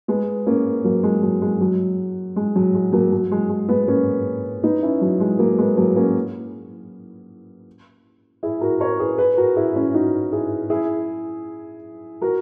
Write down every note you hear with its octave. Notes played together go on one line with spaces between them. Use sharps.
G#3 B3
A#3 C#4
F#3 A#3
G#3
F#3
G#3
F#3
G#3
F#3
G#3
F#3 A#3
F#3
G#3
G#3
G#3 B3
A#3 C#4
B3 D#4
C#4 E4
F#3
G#3
F#3 A#3
G#3 B3
F#3 A#3
A#3 C#4
E4 G#4
F#4 A#4
A#4 C#5
G#4 B4
G#4 B4
F#4 A#4
E4 G#4
C#4 E4
D#4 F#4
E4 G#4
E4 G#4
F#4 A#4